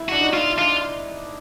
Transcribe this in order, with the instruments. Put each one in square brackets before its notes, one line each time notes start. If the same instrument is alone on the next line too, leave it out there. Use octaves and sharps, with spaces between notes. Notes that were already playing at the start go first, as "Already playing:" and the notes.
Already playing: [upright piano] E4
[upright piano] D4 [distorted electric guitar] F#4
[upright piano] D#4
[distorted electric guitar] F4
[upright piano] D4 [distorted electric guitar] F4